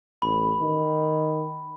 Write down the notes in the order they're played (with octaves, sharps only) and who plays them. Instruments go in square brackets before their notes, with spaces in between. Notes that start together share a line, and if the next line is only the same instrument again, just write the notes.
[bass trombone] A1 [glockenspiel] B5
[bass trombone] D#3